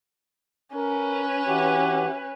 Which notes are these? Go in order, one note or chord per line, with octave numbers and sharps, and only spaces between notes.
C#4 A#4 B4
E3 F#4 G4